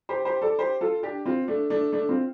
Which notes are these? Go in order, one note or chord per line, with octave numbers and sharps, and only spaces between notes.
G4 C5
G4 C5
A4 D5
G4 C5
F4 A4
D4 G4
C4 F4
A3 D4
A3 D4
A3 D4
C4 F4